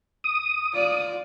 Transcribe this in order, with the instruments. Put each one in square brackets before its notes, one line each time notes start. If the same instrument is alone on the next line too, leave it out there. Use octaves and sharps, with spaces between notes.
[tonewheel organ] D#6
[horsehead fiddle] F4 D5